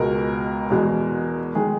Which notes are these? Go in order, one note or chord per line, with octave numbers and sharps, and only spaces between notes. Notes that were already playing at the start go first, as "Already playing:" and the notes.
Already playing: C#2 B2 G#3 A#4
E2 B2 G#3
D#3 G#3 G#4